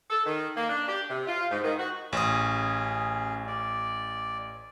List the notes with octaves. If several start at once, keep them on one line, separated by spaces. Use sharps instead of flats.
A4
D#3
A#3
D4
G4
C3
F4
G#2
D#3
F#4
A1 C#4 G#4 D#6
D5